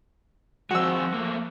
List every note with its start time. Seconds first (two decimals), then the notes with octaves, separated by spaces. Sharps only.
0.71 F3 G#3 C4 F#4 E6
1.14 A3 A#3